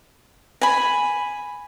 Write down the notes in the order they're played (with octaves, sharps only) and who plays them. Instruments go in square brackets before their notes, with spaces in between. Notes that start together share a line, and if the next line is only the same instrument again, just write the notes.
[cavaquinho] G#5 B5